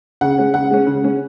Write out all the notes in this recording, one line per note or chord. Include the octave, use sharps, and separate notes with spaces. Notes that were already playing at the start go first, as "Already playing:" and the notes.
C#3 F#5
G#3 C#4
C#3 F#5
G#3 C#4
C#3
G#3 C#4